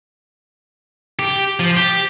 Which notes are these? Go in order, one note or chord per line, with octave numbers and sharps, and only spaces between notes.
G4
F3
G4